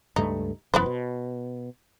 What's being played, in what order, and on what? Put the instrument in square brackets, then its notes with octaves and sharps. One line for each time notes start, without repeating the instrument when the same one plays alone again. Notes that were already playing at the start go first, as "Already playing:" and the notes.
[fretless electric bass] C#2 G2 A3 [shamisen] D#4
[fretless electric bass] F1 F#2 E3 [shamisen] B3 B4 C5
[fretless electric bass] B2